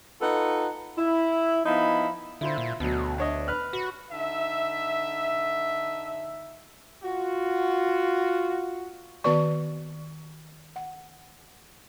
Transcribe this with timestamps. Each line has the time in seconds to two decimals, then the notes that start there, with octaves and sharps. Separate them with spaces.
0.20 D#4 F4 A4 B4 F#5
0.97 E4
1.65 F3 B3 D#4 E4 B5
2.41 D3 E4 F4 C5
2.58 A#2
2.80 D2 B2 F#3
3.18 D4 C#5 D#5
3.48 B4 F6 F#6
3.73 F#4 B4
4.11 D3 D#4 E5
7.03 F4 F#4
9.24 D#3 B3 F#4 B4 D5 C#6
10.76 F#5